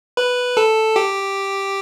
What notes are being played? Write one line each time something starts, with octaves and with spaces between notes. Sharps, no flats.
B4
A4
G4